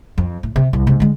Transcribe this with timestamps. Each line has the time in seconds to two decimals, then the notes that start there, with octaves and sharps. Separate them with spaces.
0.18 F2
0.43 A2
0.56 C3
0.73 C2
0.87 G#2 C3
1.00 D3 G#3